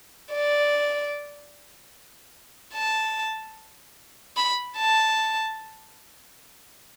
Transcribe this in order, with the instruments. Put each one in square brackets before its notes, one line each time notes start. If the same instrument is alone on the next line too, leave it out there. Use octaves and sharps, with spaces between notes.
[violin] D5
A5
B5
A5